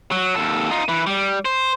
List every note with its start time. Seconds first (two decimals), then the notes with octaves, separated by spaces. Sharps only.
0.12 F#3
0.35 D#2 A4
0.71 D#4 F4
0.88 E3 B4
1.07 G3
1.45 C5